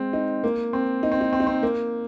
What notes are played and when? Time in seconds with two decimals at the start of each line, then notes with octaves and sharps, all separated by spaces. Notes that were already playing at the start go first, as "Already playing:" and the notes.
Already playing: G#3 C4
0.13 D#4
0.44 A#3
0.73 C4
1.03 D#4
1.12 C4
1.21 D#4
1.33 C4
1.40 D#4
1.47 C4
1.63 A#3